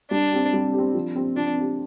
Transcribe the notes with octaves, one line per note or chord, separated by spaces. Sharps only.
G3 D4
C4 G4
G3
G4
C4
F3
C4 G4
F3 D4
C4 G4